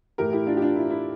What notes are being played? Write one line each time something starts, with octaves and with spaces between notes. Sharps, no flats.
A2 E3 A3 G4 A#4
E4 G4
D4 F4
G4
D4 F4
E4
E4